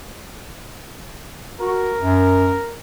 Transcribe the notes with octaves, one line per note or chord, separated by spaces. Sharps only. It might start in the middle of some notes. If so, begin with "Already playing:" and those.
F#4 A#4
F#2